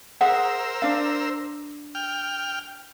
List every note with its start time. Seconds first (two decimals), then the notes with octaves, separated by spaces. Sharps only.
0.21 G#4 A#4 C5 E5 F#5 E6
0.82 D4 F5
1.95 G5 F6